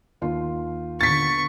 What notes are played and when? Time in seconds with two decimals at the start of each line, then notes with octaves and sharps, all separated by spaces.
0.21 D#2 F4 C6
1.01 D3 B3 C#6 A6 B6